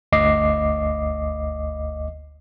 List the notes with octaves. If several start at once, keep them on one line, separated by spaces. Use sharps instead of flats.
G1 D2 D#5 D6 C7